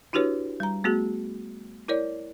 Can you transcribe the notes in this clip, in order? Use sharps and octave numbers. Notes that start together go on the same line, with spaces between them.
D4 E4 F#4 G4 B4 C#5
G3 A#5
A3 B3 F#4 G#4
E4 A#4 C#5 D5